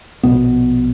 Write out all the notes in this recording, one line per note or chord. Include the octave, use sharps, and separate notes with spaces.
A#1 F#2 B2 B3